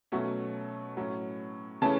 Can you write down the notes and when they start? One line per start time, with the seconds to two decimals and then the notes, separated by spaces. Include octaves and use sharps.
0.12 B2 F#3 A3 C#4
0.97 A2 F#3 C#4
1.82 C#3 E3 A3 C#4 A5